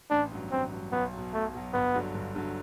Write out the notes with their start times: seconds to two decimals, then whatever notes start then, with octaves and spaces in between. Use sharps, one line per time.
0.11 A1 D4
0.32 G2 F#3
0.51 A1 C4
0.72 G2 F#3
0.92 B1 B3
1.13 B2 F#3
1.33 B1 A3
1.54 B2 F#3
1.74 G1 B3
1.95 G2 D3 F#3
2.14 G1
2.35 G2 D3 F#3